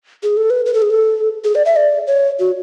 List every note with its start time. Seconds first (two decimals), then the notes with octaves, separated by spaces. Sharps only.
0.23 G#4
0.37 A4
0.50 B4
0.66 B4
0.74 A4
0.82 G#4
0.90 A4
1.44 G#4
1.55 D5
1.66 E5
1.76 D5
2.07 C#5
2.39 F#4